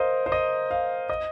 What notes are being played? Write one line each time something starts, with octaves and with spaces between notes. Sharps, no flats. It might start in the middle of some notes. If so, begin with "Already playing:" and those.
Already playing: A#4 C5 D#5 F5
C5
D#5
F5
D#5